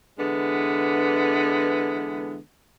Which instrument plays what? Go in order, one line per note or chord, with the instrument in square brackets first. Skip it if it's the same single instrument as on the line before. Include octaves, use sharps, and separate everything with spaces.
[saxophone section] D3 E3 G#3 B3